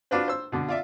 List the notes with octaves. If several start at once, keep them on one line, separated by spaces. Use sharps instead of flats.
D4 F4 F#4 B4 C5
C5 E6
B2 D3
F4 D5 E5